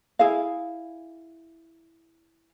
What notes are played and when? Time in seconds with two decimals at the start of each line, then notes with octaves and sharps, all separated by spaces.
0.19 E4 G#4 F5